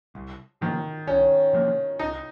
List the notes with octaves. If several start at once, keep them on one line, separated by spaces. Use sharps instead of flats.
C2
C3 D#3 F3 A#3
C2 C#4
C3 F3 A#3
C2 D#4